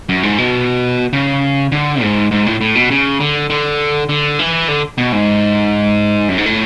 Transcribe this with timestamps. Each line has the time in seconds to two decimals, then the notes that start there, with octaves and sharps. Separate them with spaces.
0.09 F#2
0.23 G#2
0.38 B2
1.13 C#3
1.72 D3
2.02 G#2
2.31 G#2
2.46 A2
2.61 A2
2.75 B2
2.90 C#3
3.20 D3
3.50 D3
4.09 D3
4.39 E3
4.68 D3
4.98 B2
5.12 G#2
6.29 F#2
6.38 G#2
6.46 A2